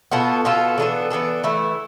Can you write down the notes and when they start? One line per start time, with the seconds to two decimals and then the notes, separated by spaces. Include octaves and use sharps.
0.11 B2 B3 F4 A4
0.45 B2 B3 F4 A4
0.78 E3 B3 D4 A4
1.10 E3 B3 D4 A4
1.44 E3 A3 E4